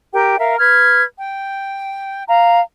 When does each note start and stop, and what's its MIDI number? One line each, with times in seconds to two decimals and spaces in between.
0.13 0.37 67
0.13 0.37 70
0.13 0.37 79
0.38 0.56 70
0.38 0.56 76
0.38 0.56 77
0.59 1.02 71
0.59 1.02 89
0.59 1.02 92
1.17 2.23 79
2.27 2.60 77
2.27 2.60 82